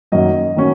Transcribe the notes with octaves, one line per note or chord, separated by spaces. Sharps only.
F#2 D#3 F#3 A#3 C#4 D#5
D#3 F#3 A#3 C#4